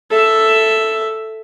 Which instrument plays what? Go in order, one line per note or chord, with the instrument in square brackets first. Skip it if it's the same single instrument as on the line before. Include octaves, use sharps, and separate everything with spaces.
[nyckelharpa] A4 E5